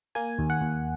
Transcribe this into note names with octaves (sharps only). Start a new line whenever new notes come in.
A#3 G#5
D#2
F#5
D#2